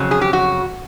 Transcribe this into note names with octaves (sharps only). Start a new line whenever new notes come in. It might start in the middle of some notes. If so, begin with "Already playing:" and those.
Already playing: F2 C#3 F#3
G#4
G4
F#4